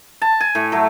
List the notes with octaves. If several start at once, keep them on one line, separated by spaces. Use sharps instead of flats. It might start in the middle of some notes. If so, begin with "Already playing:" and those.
A5
G#5
A2
F#3 A3